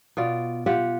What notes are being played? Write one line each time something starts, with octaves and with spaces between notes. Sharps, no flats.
B2 F4 D5
F4 G4 E5 F#5